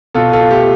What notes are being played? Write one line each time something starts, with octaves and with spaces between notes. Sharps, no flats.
B2 F4 A4
F4 A4
A3 G4